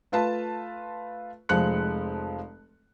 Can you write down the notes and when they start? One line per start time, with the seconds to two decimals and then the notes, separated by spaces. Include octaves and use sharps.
0.12 A3 F4 B4 A5
1.49 F1 F3 G#3 F#6 C#7